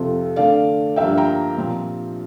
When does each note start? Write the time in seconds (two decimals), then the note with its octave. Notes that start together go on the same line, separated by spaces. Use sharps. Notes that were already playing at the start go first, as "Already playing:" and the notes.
Already playing: F2 C3 F3 F4 A4
0.36 D3 A3 D4 D5 F5
0.96 G2 F3 A#3 D4 E5 G5
1.18 G5 A#5
1.57 A#2 F3 C4